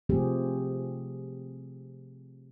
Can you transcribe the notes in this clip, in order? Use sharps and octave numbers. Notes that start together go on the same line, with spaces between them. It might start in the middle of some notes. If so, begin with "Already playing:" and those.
C3 F3 A3 C4 G4 G#4